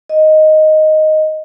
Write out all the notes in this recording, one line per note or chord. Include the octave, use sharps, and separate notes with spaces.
D#5